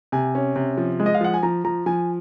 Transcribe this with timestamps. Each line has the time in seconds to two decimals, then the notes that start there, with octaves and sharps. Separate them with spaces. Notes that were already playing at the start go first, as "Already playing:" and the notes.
0.12 C3 G#5
0.35 C#4
0.56 C3
0.77 F3
1.00 G#3
1.06 D#5
1.14 F5
1.21 F3 F#5
1.34 G#5
1.43 F3 A#5
1.64 F3 A#5
1.86 F3 G#5